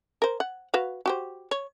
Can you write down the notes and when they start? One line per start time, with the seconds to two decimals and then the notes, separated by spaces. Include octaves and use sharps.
0.22 A#4 C5
0.40 F#5
0.74 F#4 B4 F5
1.06 F#4 G4 C5
1.51 C#5